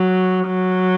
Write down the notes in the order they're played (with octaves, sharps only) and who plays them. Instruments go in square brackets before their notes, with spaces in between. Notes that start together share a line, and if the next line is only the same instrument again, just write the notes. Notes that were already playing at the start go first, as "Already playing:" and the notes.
Already playing: [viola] F#3
F#3